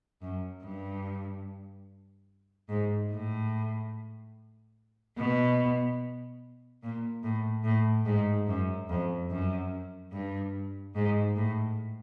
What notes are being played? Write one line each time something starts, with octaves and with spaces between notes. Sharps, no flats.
F#2
G2
G#2
A2
B2
A#2
A2
A2
G#2
F#2
F2
F#2
G2
G#2
A2